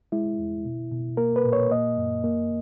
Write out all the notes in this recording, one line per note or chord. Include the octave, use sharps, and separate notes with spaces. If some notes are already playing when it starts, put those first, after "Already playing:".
G#3 E4
E2
B2
B2
A#3 A#4
B4
A#2
C#5
A#3 D#5
F#2
A#3